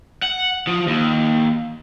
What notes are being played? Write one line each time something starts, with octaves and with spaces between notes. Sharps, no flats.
F#5
F3
D#2